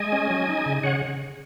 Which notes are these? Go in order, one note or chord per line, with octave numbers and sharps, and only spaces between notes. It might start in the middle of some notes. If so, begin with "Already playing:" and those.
Already playing: G#3 D#5 G#5
C#4
F#3
D#4
C#3
C#3 C#5 F#5